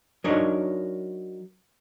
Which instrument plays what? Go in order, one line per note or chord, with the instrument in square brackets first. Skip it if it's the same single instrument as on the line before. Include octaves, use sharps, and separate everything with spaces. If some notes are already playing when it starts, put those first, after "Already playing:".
[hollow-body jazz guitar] F#3 D4 D#4 A#4 C#5